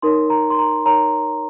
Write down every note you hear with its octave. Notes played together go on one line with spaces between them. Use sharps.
D#4 A#4 C#5 C6
A#5
C6
A#5
D#4 A#4 C#5 A#5